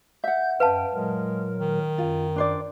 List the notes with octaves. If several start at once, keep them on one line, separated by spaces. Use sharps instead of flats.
E5 F#5 G6
F#2 B4 F5 G5 A5
A#2 F#3 G#3 A#4
D#3
F#2 F4
D4 C5 D5